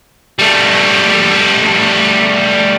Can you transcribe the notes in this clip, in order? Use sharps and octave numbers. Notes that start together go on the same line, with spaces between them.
G3 A3